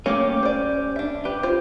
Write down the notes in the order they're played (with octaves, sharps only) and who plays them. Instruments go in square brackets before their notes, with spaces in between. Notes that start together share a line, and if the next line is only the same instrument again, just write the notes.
[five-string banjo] A3 A#3 C#5 [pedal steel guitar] C#4 G4 D6
[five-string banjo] C5 D5
D4 E5
[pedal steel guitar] G4 [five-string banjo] B4
[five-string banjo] F4 C5